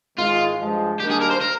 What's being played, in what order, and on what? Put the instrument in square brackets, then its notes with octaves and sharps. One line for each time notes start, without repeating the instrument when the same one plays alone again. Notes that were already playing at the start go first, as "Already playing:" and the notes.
[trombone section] G#2 D#3 G#3 [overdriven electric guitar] F4
[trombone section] G2 F3 G#3
[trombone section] D#3 G3 A#3 D4 [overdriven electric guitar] G4
[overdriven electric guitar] G#4
A#4
C5
A#4